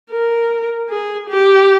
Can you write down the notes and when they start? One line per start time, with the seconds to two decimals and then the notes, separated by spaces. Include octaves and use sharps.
0.11 A#4
0.89 G#4
1.29 G4